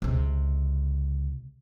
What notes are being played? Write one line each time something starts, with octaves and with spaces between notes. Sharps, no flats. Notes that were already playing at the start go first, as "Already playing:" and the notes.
C#2 C3